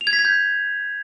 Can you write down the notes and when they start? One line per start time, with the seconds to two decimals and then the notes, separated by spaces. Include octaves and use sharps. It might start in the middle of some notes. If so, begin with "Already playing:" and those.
0.01 F7
0.07 G#6
0.13 B6
0.19 G#6
0.25 G6